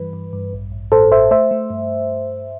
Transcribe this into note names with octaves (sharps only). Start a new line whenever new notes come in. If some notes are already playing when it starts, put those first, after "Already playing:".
Already playing: G2 E3 G3 B4
G2
G2
A1
A1
A2 A4 C5
A1 C5 E5
A3 C5 E5
A3
G2